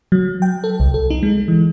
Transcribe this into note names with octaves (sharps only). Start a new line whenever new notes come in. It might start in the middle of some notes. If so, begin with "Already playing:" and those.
F#3
G5
A4
C2
A4
D#4
G#3
E3